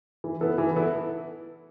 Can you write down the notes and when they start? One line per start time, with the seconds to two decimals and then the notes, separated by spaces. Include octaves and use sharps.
0.24 E3
0.41 B3 E4 A4
0.58 E3
0.76 B3 E4 A4